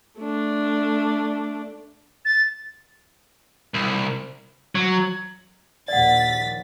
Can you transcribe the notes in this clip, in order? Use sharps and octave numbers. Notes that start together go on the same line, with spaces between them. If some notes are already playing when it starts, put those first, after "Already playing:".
A3 D4
A6
C2
F#3
A#1 D#2 D5 F#5 A6 B6